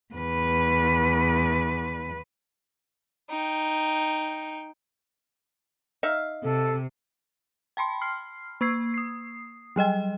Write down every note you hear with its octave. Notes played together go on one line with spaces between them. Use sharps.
E2 B4
D#4 G5
D#4 E5 F5
C3 A4
G5 A5 B5 C6
C6 F6 C7
A#3 C#6 E6 G#6 C7
D#6 C7
F#3 G3 D#5 G5